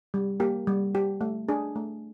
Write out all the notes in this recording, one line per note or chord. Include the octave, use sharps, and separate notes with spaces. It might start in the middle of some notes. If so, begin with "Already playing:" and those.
G3
A#3 G4
G3
G4
A3
D4 G#4
A3